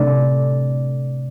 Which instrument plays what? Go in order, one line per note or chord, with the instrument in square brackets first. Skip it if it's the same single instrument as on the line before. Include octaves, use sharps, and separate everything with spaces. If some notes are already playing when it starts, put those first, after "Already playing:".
Already playing: [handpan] C3 A3 D4 D5